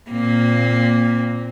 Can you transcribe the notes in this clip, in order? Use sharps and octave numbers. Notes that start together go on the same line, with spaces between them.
A#2 A#3 C4